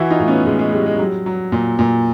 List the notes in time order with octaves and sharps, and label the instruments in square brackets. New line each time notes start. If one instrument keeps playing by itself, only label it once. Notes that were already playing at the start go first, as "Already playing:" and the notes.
Already playing: [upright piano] E3 E4 F#4
D#4 F4
A2
B3 C#4
A2 G#3
G#3
G3 G#3
G#3
F#3 G3
F#3
A#2
A#2